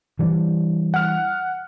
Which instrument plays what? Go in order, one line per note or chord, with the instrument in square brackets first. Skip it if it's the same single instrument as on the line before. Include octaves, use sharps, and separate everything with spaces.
[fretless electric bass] E3 G3 D4
[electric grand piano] F#5 F6